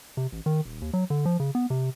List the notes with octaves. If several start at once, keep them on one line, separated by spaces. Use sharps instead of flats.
C3
A1
D#3
D#1
D#2
F#3
D3
F3
C#3
B3
C3